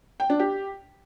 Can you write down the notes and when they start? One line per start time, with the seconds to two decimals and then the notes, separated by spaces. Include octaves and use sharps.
0.20 G5
0.30 D4
0.39 G4